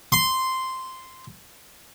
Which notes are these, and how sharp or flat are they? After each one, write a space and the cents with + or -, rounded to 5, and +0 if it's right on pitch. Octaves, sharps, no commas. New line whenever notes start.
C6 -10